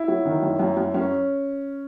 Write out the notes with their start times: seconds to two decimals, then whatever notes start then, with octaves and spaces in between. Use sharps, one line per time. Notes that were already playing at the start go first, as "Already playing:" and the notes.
Already playing: E4
0.08 F#3
0.25 D#3
0.42 F#2
0.60 F#2
0.77 F#2
0.94 F#2 C#4